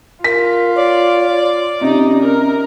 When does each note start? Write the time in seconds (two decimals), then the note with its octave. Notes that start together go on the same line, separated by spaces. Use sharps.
0.24 F4 A#4 B6
0.76 C#5 D5
1.81 C3 C#4 D#4
2.23 A#4